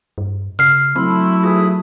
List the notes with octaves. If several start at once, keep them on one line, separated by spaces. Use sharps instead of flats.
G2
C#3 F6 C7
F#3 A3 C4 E4 B5 C6 E6
F4 G#4 B4 D#6